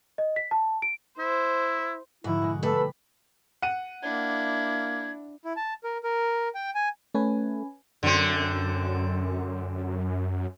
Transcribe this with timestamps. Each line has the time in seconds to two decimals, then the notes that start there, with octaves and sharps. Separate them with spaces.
0.18 D#5
0.36 B6
0.51 A5
0.82 D7
1.19 E4 C5
2.24 G#2 D3 F3 E4 F#4
2.42 B2 G#3
2.63 G3 A3 A4 B4
2.75 B5
3.62 F#5 D#7
4.03 A#3 D4 E4 G#6
5.45 E4
5.56 A5
5.84 A#4
6.03 A#4
6.55 G5
6.75 G#5
7.14 A3 C#4 B4 G#5
8.03 F#2 D3 C4